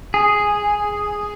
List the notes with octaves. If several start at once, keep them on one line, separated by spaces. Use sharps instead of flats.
G#4